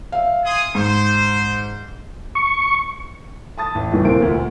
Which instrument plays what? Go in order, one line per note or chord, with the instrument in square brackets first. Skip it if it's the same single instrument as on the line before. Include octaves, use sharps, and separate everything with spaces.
[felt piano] E5 F5
[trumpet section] G#4 C6 D#6
[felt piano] G#2 [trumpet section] C5
[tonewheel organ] C#6
[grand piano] A5 D#6 A6
A1
G1 A2 E3
C3 E3 A#3 C5 D7
D2 A#2